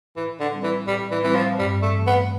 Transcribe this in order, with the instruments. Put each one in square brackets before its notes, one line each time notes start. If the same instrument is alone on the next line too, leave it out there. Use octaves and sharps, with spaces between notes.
[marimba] A2 [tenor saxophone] E3
[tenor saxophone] D3
[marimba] G3 C4
[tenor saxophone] E3
[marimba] A2 [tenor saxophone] G3
[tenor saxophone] E3
[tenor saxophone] E3 [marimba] G3 C4
[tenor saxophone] F3
[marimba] G2 [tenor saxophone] G3
[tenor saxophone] A3
[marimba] E3 A3
[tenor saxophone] B3